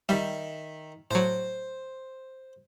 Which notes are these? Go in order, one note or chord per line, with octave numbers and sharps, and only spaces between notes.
D#3 G3 E5
A2 F#3 C5